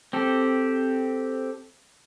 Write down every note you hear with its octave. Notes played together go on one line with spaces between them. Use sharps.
C4 G4 A4